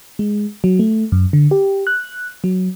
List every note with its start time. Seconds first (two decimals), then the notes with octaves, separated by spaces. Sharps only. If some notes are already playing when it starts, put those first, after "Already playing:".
0.19 G#3
0.64 F#3
0.79 A3
1.12 F#2
1.33 D3
1.51 G4
1.87 F#6
2.44 F#3